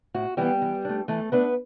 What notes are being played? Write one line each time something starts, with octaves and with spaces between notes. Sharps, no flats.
A2 F#4
E3 G3 B3 G4
E3
A3 D4
E3 A3 A4
A3 B3 D4 B4